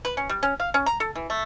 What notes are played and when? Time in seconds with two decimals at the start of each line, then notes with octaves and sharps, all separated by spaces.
0.05 B4
0.17 C#4
0.29 G3
0.43 C#4
0.60 F5
0.74 C#4
0.86 A#5
1.00 A4
1.15 E3
1.30 A3